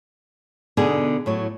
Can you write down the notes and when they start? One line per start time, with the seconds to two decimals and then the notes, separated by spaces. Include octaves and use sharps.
0.77 B2 D3 B3 D#4 G#4
1.26 A2 F#3